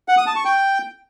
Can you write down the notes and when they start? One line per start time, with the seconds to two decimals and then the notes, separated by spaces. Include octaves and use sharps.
0.08 F#5
0.18 D#6
0.27 A5
0.36 C#6
0.45 G5